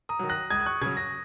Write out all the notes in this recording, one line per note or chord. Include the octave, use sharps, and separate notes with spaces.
A#5 D#6
D#3 F#3
F#6 A#6
C#2 D#6 G#6
D#6
C#6 F#6
C#3 F#3 D#6 G#6
A#6